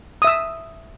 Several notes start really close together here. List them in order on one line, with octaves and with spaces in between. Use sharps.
D#6 E5 E6